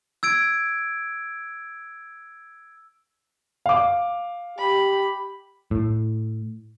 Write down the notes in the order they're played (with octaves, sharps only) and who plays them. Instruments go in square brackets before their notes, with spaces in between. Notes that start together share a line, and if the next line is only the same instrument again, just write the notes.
[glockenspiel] E6 G#6 D7
[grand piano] F5 D6
[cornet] G4 [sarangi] B5
[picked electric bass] A2